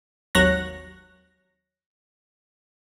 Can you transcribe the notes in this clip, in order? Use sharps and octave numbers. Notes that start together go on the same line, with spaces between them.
G#1 D#2 F#3 C#5 F#6 A#6